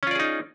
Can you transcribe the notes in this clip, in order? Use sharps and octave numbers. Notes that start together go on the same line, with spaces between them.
C#4 D#4 F4 G#4 D5